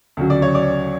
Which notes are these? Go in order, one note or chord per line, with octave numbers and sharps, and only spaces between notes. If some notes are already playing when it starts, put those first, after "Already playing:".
D2 C#3 F#3
D5
C#5
D5